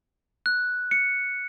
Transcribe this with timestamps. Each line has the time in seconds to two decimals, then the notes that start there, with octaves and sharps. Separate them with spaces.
0.46 F#6
0.91 C#7